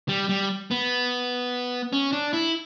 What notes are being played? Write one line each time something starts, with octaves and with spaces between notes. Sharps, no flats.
G3
G3
B3
C#4
D4
E4